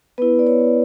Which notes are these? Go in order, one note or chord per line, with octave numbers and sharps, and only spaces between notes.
B3 E4 B4
D5
C#5